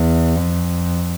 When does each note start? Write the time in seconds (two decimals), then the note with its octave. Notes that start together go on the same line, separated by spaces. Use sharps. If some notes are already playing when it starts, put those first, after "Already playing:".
Already playing: E2
0.36 F2